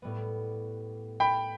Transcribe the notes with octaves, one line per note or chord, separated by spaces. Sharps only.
A2 G3 B3
G5 B5